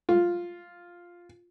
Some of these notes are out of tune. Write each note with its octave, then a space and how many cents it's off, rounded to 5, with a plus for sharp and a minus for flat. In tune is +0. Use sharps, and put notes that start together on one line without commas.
F4 +0